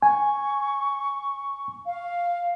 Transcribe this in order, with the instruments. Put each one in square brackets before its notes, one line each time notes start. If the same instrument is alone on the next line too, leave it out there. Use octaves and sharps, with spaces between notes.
[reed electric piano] G#5 [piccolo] C#6
[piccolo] F5